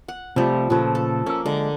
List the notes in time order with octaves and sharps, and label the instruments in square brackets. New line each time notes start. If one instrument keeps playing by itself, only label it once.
[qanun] F#5
[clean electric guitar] C3 A3 [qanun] F3 G3
[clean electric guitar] A#2 C#3 B4 [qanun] F3 A3
[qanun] A4
[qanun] A#3 [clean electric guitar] C#4 A4
[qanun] D3 [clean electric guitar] G#3